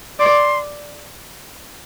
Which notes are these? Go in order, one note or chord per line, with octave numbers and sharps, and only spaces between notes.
D5 C6